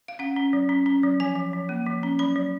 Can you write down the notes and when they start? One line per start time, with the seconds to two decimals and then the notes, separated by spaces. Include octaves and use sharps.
0.08 F5
0.19 C#4 F#5
0.36 C#4
0.53 F#3
0.69 C#4
0.86 C#4
1.03 F#3
1.20 F3 G#5
1.36 F3
1.53 F3
1.69 A#3
1.86 F3
2.03 C#4
2.19 F#3 B5
2.36 F#3